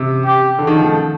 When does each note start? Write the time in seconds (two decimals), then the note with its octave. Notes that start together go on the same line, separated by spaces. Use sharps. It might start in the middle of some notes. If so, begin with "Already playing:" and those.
Already playing: C3
0.25 G4
0.59 D3
0.67 D#3
0.76 F3
0.84 A3